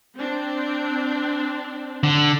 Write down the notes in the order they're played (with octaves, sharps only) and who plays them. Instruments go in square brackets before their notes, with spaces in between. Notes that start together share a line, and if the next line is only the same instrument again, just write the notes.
[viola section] C4 D4
[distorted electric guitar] D3